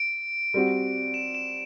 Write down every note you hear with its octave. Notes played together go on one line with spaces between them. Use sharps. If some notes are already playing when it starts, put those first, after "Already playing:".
Already playing: D7
G3 C4 F#4
E7
E7